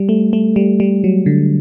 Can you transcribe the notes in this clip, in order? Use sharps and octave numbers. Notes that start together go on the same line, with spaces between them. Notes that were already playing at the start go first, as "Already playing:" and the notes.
Already playing: G3
A3
A3
G3
G3
F#3
D3